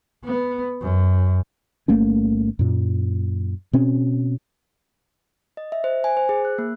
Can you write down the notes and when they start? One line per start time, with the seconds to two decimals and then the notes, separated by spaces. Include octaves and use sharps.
0.25 B3
0.81 F#2
1.88 G1 A3 A#3 C#4
2.59 F#2 A#2
3.73 B2 C4 C#4
5.57 D#5
5.72 E5
5.84 C5
6.04 G#5
6.17 C5
6.29 G#4
6.45 F#6
6.58 A#3